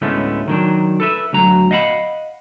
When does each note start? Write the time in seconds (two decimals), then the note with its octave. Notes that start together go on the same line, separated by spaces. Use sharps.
0.02 D2 A2 G#3 A3 B3 C#4
0.48 D#3 F#3 D4
1.00 A4 B4 E5
1.33 D2 F#3 A#5
1.71 D#5 F5 F#5 A5 B5